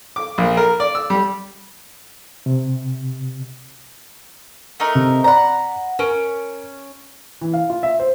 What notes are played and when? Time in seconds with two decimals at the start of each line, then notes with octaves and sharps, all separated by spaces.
0.16 D6
0.38 A#1
0.57 A#4
0.80 D5
0.95 E6
1.10 G3
2.46 C3
4.80 A3 D#4 A#4
4.95 C3
5.24 D5 F#5 A#5 B5
5.99 C#4 A#4 D7
7.41 E3
7.53 F5
7.70 F4
7.83 E5
8.00 C5